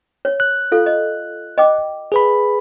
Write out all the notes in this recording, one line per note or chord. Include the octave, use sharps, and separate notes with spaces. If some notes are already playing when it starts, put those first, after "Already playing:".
C#5
F#6
F4 A4 F5
D#5
D#5 G5 D6
G#4 B4 B5